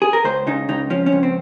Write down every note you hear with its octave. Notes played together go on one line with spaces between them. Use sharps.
G#4
A#4
C#2 C5
C#3 D#4
C#2 D#4
F3 C#4
C#4
C#2
C4